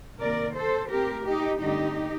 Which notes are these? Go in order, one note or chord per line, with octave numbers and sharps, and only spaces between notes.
C3 D#3 A#3 A#4 D5
A4 C5
A2 A3 C4 G4 A#4
D#4 G4
G2 D3 A3 C4 D#4 G4